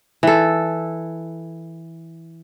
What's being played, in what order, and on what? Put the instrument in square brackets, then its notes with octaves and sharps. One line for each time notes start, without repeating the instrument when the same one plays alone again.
[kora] E3 A4